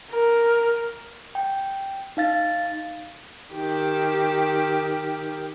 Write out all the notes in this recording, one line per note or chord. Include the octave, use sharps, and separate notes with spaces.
A#4
G5
D#4 F5 A6
D#3 G4